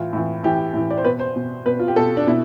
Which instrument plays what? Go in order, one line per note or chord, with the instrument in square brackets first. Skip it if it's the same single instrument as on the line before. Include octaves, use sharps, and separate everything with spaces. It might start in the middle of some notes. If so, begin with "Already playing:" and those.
Already playing: [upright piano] A2 E3 F4
A2 E3
A2 E3 G4
A2 E3
D5
C5
B2 B4
C5
B2
B2 B4
F4
G4
B2 A4
D4
B2 E4